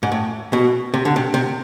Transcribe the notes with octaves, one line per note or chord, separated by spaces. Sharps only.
G#2
A2
B2
C3
D3
C3
C3